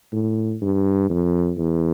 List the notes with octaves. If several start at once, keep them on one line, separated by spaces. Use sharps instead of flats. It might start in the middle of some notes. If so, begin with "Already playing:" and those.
A2
G2
F2
E2